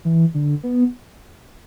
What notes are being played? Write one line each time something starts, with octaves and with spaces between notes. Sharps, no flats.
E3
D3
B3